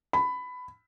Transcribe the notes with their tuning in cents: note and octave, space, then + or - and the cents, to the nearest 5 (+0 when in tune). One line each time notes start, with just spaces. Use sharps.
B5 +15